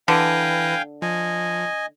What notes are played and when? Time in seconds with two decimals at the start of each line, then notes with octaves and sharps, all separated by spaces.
0.08 D3 E3 B4 F5 G5 G#5 A#6
1.02 F3 D#5 G#5